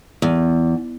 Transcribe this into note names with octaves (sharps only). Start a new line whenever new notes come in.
E2